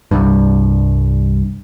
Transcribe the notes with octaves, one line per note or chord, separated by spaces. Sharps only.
C2 G2